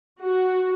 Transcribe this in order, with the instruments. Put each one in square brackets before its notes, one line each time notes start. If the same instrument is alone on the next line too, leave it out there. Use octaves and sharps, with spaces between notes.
[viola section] F#4